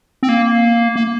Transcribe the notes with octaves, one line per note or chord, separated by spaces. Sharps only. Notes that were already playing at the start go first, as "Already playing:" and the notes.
C4
A#3
A#3